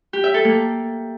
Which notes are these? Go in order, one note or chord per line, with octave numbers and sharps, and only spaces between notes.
G4
E5
A4
A#3